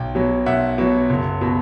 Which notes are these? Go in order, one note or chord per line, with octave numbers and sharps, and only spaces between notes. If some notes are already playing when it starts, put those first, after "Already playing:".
Already playing: B1 G5
B2 F#3
B1 E5 F#5
B2 F#3
F#1
B2